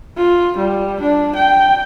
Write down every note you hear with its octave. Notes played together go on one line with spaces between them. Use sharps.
F4
G3
D4
G5